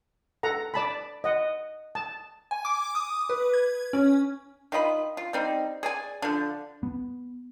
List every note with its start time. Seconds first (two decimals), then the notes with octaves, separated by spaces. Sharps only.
0.43 A4 F#5 A#5
0.74 D5 A5 B5
1.24 D#5 F#5
1.95 A5
2.51 G#5
2.65 D6
2.95 D#6
3.29 B4
3.53 G#6
3.93 C#4
4.72 D#3 F4 D#5 B5
5.17 F4
5.33 G3 C4 D#4
5.83 G#4 D5 G#5
6.22 D3 F3
6.83 B3